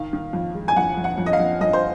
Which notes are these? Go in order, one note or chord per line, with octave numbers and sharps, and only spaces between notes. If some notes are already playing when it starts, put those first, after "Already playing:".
Already playing: D#3 F5
D#3
F2
G#3
G#5
F2 F#5
F2
F#5
F2
D#5
F5
F2
F2 D#5
C5